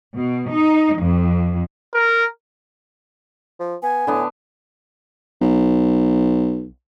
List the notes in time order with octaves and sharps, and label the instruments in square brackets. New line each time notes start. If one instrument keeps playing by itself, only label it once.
[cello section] B2
D#4
F2
[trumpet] A#4
[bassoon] F3
[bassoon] B3 [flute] G#5
[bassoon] A2 [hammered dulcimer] D3 B3
[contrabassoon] B1